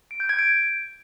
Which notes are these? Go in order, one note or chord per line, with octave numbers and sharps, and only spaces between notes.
D7
G6
G#6
D7